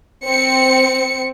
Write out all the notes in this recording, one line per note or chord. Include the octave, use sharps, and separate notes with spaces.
C4 C#7